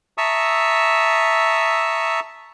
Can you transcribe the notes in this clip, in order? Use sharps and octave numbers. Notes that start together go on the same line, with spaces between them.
E5 A5 A#5 C#6 D#6 E6